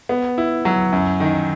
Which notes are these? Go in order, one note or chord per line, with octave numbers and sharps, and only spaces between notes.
B3
E4
F#3
F#2
D#3